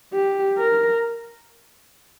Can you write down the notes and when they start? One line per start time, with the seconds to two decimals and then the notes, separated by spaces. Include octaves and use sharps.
0.13 G4
0.58 A#4